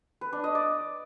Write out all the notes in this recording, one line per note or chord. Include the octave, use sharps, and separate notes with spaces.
B4
D4
D#5
D5